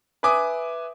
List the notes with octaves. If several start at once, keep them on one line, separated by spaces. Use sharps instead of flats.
B4 E5 G#5 D6 D#6